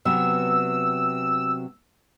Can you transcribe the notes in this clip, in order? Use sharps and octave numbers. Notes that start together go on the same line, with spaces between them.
C3 F#3 B3 E6